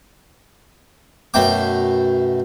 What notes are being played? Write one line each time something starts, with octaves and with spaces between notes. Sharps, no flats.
F#2 B2 A3 G5 D6